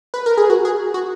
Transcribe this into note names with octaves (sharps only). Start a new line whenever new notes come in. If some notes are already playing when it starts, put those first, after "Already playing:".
B4
A#4
G#4
F#4
G#4
F#4